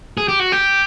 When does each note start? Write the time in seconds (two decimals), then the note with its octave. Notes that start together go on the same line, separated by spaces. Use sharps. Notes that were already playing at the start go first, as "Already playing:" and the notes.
0.18 G#4
0.28 G4
0.40 F#4
0.52 G4